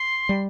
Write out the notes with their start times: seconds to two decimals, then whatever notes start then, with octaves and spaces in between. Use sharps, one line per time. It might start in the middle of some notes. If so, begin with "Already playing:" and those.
Already playing: C6
0.29 G3